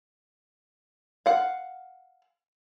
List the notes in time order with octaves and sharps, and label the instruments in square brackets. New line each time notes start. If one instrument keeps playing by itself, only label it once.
[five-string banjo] F5 F#5